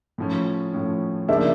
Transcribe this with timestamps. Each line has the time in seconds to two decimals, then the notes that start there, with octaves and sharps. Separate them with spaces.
0.18 A2 F3 C#4
0.73 A2 F3 C#4
1.28 C#3 F3 A#3 D4 E5